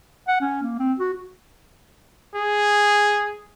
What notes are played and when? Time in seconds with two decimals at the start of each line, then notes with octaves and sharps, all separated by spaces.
0.28 F#5
0.41 C#4
0.62 A#3
0.79 C4
0.99 F#4
2.35 G#4